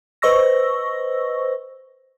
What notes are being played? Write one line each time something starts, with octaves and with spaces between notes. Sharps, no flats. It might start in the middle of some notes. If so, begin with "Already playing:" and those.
B4 C5 D#5 C#6 E6 A#6